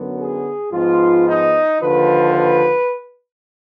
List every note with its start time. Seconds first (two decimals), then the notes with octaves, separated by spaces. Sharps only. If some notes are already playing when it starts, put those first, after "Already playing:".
Already playing: F#2 D3 F#3 B3
0.18 G#4
0.72 G#2 F3 B3 F4
1.28 D#4
1.81 D#2 D3 F3 B4
2.36 B4